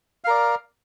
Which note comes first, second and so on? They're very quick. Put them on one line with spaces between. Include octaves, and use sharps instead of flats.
F5 A#4 D5